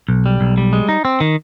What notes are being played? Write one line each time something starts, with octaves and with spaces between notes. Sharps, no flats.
B1
G3
B1
G3
G#3
D#4
C4
D#3